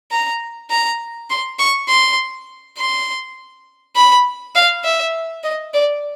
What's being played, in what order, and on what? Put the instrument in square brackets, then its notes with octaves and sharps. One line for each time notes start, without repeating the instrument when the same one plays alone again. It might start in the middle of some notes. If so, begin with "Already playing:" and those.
[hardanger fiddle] A#5
A#5
C6
C#6
C6
C6
B5
F5
E5
D#5
D5